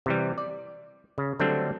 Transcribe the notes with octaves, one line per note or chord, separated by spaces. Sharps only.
C3 E3 G3
D5
C#3
D3 F#3 G3 A3 C4 D4